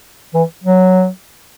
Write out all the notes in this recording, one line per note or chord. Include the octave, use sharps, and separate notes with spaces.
E3
F#3